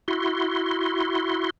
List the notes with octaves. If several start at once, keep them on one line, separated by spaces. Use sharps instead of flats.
E4 F#4 C6